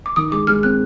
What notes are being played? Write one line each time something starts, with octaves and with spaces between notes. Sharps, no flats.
D6
D#3 D#6
G#3 D6
G#3 F6
C4 F#6